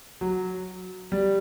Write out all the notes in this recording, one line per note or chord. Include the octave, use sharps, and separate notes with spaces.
F#3
G3